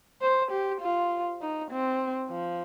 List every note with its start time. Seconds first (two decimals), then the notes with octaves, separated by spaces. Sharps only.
0.22 C5
0.51 G4
0.81 F4
1.41 D#4
1.71 C4
2.30 F3